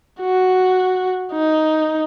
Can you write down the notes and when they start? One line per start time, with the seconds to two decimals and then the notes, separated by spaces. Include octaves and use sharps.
0.21 F#4
1.32 D#4